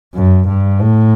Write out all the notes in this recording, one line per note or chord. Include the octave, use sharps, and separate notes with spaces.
F#2
G2
A2